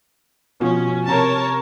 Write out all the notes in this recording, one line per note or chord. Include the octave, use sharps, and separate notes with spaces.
B2 F3 C#4
C3 A#4 C#5 A5 A#5